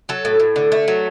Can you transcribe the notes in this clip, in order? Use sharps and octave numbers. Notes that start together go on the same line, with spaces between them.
F#3 A4
A2
A2
D3
A3
F#3